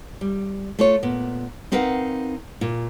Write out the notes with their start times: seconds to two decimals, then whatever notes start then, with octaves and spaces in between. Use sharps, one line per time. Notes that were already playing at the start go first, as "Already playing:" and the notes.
0.21 G3
0.79 A3 F4 C#5
1.03 A#2 B3
1.72 C4 D#4 A#4 B4 F5 F#5
2.61 A#2 F4